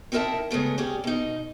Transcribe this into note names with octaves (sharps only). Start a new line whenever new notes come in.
C4 D#4 E4 A#4 E5 A5
C#3 G#3 A3 B3
C#4 G4 G#4 D5
B2 D#4